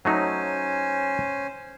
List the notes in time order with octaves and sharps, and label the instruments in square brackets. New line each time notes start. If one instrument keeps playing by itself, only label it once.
[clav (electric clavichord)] F#3 A3 D#4 [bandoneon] C#4 C5 G#5